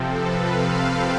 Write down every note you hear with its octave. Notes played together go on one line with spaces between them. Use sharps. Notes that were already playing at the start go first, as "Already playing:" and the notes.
Already playing: C3 F3 C4 A4
B4
F5
G5